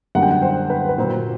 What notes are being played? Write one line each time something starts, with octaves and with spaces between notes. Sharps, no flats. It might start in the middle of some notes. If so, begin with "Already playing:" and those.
F#2 D3 G3 A#3 F#5
G5
F#5
C5
B4
B4
A#2 F#3 A#3 C5